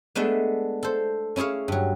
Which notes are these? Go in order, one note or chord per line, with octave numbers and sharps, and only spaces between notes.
G#3 A3 B3 D4 E5
A4 C5
C#4 E4 G#4 C#5 F5
G2 F#3